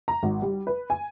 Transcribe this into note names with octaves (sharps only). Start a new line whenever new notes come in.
A#5
G#1
G3
B4
G#5